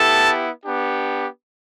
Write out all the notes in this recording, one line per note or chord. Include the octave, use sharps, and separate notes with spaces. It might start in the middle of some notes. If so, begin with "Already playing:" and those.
Already playing: B3 E4 G4 A4 A5
B3 D4 G4